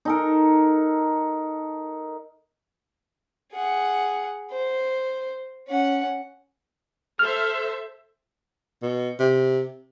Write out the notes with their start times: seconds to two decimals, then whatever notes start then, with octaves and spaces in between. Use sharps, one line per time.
0.05 D#4 A4 A#4
3.53 G#4 F#5
4.50 C5
5.68 C#4 F#5
7.19 A4 C5 E5 F6
8.82 B2
9.19 C3